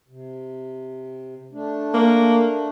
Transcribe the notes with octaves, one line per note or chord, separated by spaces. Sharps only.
C3
A3 D4
A#3